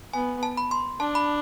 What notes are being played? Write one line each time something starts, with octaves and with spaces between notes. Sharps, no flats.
B3 G#5
A5
B5
C6
D4 A5
B5